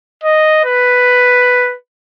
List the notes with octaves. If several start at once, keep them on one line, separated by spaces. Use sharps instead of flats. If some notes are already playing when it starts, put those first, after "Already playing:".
D#5
B4